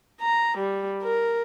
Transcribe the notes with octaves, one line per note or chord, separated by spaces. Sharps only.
A#5
G3
A#4